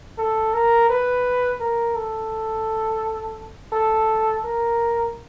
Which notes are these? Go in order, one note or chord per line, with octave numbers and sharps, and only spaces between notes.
A4
A#4
B4
A#4
A4
A4
A#4